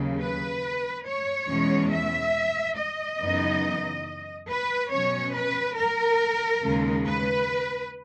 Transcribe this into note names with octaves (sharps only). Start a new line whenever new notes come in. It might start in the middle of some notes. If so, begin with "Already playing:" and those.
Already playing: D#2 C#3 F#3
B4
C#5
E2 B2 G#3 C#4
E5
D#5
F#2 C#3 E3 B3 D#4
B4
B2 F#3 C#4 C#5
B4
A#4
D#2 C#3 G#3
B4